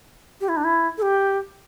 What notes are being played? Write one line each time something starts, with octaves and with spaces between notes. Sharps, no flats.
G4
E4
D4
E4
A4
G4